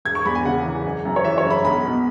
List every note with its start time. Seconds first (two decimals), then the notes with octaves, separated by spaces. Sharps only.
0.05 E1 G#6
0.15 C#6
0.25 E2 B5
0.35 G#5
0.45 C#3 F#5
0.65 E3
0.84 F#1
1.05 F#2
1.16 C#5
1.24 E3 E5
1.38 C#5
1.45 F#1
1.50 B5
1.65 B1 B5
1.85 B2